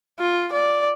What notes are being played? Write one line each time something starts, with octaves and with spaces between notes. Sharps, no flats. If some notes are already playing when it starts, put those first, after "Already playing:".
F4
D5